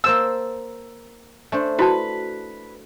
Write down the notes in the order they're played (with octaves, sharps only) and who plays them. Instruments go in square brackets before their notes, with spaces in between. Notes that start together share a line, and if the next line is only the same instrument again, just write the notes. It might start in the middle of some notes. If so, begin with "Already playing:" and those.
[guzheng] A#3 C5 A5 [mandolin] E6
[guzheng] A3 D4 C5
[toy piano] E4 F#4 A5 [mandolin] B4